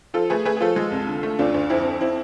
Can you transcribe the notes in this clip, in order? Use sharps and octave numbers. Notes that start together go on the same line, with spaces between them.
F3 F4 A4
A3 G#4 B4
A3 G#4 B4
G#4
F3 F4 A4
G#3
C2
D3
A3
D2 D4 F4
D2
F2 C4 E4
F2
C4 E4